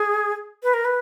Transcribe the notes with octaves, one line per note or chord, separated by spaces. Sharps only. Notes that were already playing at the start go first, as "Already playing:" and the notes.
Already playing: G#4
B4
A#4
B4